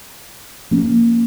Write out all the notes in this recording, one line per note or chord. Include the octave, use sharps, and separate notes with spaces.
F3 A#3 C#4